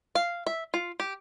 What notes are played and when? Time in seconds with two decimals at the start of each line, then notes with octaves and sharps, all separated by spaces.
0.15 F5
0.47 E5
0.74 F4
1.00 G4